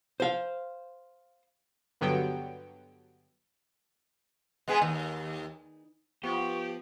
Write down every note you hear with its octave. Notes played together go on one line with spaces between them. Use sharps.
C5 F5
G2 D3 F#3 B3 G5
G#3 B3 G#4
D#2
F3 B3 G4 C#6